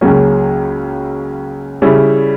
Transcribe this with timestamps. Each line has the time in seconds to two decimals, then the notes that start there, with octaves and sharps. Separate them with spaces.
0.01 C#2 C#3 F#3 A#3 C#4
1.82 C#3 G3 C#4 E4